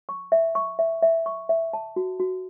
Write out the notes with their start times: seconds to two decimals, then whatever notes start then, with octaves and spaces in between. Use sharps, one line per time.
0.09 C#6
0.32 E5
0.55 C#6
0.79 E5
1.03 E5
1.26 C#6
1.49 E5
1.73 A5
1.96 F#4
2.20 F#4